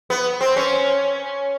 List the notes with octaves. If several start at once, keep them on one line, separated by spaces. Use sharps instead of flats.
B3
C4
C#4